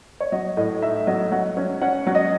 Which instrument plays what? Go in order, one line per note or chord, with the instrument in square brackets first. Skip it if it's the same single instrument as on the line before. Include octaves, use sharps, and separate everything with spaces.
[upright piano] C#5
F#3 D#5
A2 D#5
D#4 E5
F#3 D#5
F#3 F#5
C#4
C#4 F#5
F#3
D#5